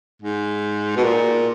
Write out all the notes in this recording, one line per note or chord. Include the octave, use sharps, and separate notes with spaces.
G#2
B2
A#2